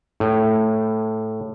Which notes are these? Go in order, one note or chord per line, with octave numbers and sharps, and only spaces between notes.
A2